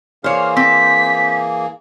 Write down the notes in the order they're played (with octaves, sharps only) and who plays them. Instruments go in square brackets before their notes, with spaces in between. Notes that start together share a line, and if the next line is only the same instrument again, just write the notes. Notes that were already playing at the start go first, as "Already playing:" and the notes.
[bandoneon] E3 A#3 G#4 [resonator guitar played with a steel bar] C5 C#5 [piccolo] F6
[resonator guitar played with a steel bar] C4 [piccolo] B6